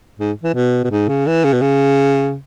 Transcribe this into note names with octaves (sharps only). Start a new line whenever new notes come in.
G#2
E3
B2
B2
G#2
C#3
E3
C#3
B2
C#3